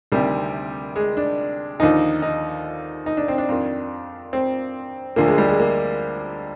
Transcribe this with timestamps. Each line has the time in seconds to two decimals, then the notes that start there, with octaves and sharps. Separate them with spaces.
0.12 D2 C3 D#3 G3
0.96 G#3
1.17 D4
1.80 D#2 D3 F3 D#4
2.22 D#4
3.06 D#4
3.17 D4
3.28 C4
3.38 D4
3.49 F2 D#3
4.33 C4
5.16 D2 D3 F3 A#3
5.28 G#3
5.38 G3
5.48 G#3
5.60 A#3